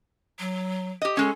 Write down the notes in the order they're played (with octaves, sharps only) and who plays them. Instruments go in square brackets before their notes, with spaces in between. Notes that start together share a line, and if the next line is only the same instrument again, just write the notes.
[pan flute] F#3
[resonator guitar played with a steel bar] G4 D#5
[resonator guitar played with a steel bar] G#3 C#4 [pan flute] A4